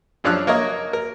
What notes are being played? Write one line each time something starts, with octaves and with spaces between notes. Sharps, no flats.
F#2 F3 D4 F5 E6 F#6
A#3 A#4 C#5 D#5
A#4